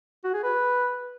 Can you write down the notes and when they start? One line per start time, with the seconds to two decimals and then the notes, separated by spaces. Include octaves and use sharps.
0.24 F#4
0.34 G#4
0.43 B4